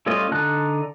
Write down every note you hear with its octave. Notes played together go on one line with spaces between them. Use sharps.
G3 A3 C#4 F4 D#5
D3 D#4 A5 F#6